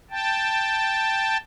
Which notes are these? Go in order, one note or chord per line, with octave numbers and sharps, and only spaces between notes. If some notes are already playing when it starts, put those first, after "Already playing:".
G5 A5